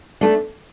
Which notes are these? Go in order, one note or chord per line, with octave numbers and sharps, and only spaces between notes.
A3 D4